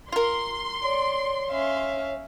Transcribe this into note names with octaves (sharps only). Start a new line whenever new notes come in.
F4 A#4 C6
C#5 D5
C#4 E5 F5